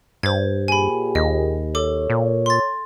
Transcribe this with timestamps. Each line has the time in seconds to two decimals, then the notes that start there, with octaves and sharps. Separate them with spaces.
0.23 G2 C5 G#6
0.68 A#2 G4 G#4 G#5 B5
1.15 D#2 D#5
1.75 A4 C#5 D6
2.10 A#2
2.46 C6 A6